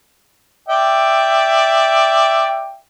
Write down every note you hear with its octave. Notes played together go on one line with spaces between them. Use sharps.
D5 E5 G5